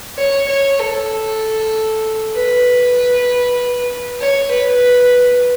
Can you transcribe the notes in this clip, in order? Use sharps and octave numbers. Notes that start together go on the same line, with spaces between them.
C#5
C#5
A4
B4
C#5
B4